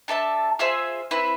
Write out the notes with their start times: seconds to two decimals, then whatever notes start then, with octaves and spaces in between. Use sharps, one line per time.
0.08 D4 A4 E5 A5
0.59 F4 G#4 C5 E5
1.11 C4 E4 B4